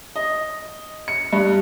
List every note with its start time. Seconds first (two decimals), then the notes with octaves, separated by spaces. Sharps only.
0.16 D#5
1.08 C#7
1.33 G2